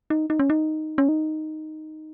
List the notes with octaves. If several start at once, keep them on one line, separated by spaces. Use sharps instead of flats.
D#4
D#4
C#4
D#4
C#4
D#4